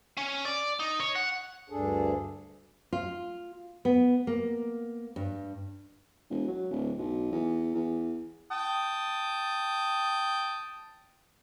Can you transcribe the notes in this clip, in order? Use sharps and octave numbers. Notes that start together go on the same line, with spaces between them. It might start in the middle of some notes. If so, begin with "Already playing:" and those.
C#4
D5
D#4
C#5
F#5
D2 G2 D4 G#4 A4
F4
B3
A#3
G2
E1
F#3
D1
B1
E2
E2
G5 A5 D#6